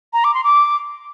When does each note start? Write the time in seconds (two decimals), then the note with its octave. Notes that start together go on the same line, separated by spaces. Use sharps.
0.13 A#5
0.24 D6
0.34 C6
0.44 D6